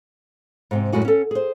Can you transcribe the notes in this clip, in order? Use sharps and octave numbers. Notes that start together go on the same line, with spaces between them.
G#2 C3 C4
F#2 A2 G#3 F#4 G#5
C#4 A4
G#4 C5